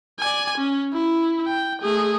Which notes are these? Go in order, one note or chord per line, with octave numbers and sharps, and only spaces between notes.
D5 G#5
C#4
E4
G5
A3 G#4